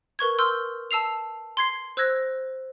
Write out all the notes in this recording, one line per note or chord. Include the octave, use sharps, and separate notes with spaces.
A#4 B4 C#6 G#6
C6 E6 F6 G6
A5 E6 C7 F7
C6 G#6 C7
C5 E6 F#6 G#6 A#6